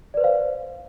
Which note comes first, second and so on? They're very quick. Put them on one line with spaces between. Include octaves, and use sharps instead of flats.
D5 B4 C5 F5